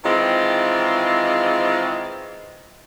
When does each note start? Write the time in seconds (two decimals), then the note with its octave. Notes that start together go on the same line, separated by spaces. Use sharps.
0.04 D#3 E3 G#3 C4 F4